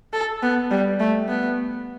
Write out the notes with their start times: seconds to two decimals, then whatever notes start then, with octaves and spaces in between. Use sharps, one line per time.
0.13 A4
0.42 B3
0.71 G3
1.00 A3
1.28 B3